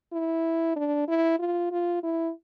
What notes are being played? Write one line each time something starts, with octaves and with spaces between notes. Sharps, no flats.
E4
D4
E4
F4
F4
E4